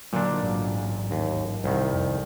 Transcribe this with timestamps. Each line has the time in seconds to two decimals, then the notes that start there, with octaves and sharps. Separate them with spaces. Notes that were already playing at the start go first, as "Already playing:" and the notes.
0.13 A#2 D3 F#3 D4
0.43 A1 G#2 F#3
1.11 D#2
1.64 C2 D#3
1.93 F2